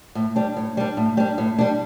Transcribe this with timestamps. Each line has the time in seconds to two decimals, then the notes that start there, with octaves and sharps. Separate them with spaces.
0.15 A2
0.36 G3 D4
0.56 A2
0.77 G3 D4
0.97 A2
1.17 G3 D4
1.38 A2
1.58 G3 D4